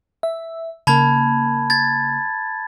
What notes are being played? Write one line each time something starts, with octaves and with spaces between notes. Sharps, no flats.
E5
C#3 A#3 A5 B5 G#6
G#6 A6